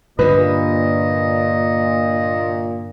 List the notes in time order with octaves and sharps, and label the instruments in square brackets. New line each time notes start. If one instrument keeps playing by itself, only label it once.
[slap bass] G2 D3 [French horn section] A#2 [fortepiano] B4 [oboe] D#5